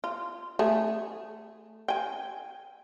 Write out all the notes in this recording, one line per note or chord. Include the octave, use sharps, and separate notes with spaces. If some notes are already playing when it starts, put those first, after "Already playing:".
F4
A3 G#4
G5 G#5